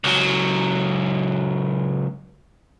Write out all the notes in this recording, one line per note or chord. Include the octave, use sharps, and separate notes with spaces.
C#2 F#3